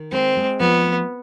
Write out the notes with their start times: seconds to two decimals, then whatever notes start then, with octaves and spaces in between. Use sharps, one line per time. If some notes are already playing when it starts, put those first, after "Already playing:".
Already playing: D#3
0.12 G#3 C4
0.37 G#3
0.60 F3 B3
0.84 A3